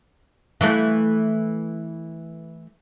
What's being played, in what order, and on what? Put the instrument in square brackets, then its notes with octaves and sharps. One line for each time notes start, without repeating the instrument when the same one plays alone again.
[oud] E3 A3